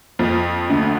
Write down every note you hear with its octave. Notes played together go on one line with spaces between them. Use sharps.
F2 F3
D2 D3